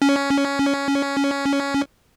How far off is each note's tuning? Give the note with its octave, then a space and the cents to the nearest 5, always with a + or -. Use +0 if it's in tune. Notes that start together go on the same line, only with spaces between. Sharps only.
C#4 +10